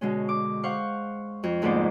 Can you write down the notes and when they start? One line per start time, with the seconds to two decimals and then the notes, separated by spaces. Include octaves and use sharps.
0.01 B2 D3 G#3 C#4
0.29 D6
0.63 C5 F5 F#5 C#6
1.43 F2
1.62 D2 G#2 A#3 B3 C5 D5